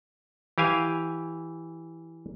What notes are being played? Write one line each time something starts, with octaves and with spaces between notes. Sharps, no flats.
E3 G4 F5 G#5